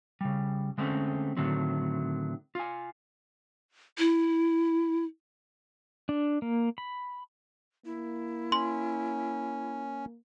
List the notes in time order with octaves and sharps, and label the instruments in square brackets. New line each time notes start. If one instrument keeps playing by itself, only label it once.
[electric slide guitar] C#3 G3
D3 G#3 A3 C4 C#4
A2 D3 D#3 F#3 C4
F4 G#5
[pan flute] E4
[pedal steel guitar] D4
A#3
B5
[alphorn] A#3 [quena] E4
[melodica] C#4 [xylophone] C6